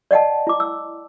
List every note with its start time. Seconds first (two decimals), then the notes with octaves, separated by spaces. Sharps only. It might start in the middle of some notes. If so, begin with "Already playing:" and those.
0.11 D5 D#5 F#5 G5 A5
0.47 E4 D6
0.60 E6